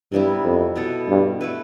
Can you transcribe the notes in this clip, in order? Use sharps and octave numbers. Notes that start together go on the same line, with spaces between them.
G2 C3 G3 B3 E4
F2
B2 B3 E4 A4
G2
A3 E4 B4